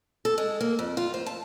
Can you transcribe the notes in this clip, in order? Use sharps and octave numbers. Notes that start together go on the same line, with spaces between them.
A4
G#3
A#3
F2
F4
C5
A5